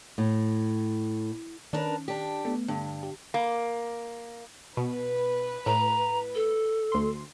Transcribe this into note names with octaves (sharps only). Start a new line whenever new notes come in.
A2
D#3 C#4 D4 A#4 B4
D4 G4
A3 B3
G2 D3
G4
A#3
B2 B4
A2 A#5
A4
D2 C6